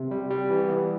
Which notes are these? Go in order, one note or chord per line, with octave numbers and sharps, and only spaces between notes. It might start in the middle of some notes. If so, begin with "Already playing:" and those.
Already playing: C3
G3
G3
E3
B3